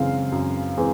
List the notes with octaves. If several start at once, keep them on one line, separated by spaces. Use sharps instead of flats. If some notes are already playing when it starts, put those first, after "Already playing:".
Already playing: F#2 C#3 E3 G#3 C4 F5
F#2
E3 G#3 C4